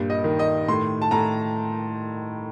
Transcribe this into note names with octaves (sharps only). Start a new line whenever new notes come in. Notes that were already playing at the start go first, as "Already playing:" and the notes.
Already playing: G2 A#2
D#5
D#3
D#5
A2 C6
A5
A2 A#5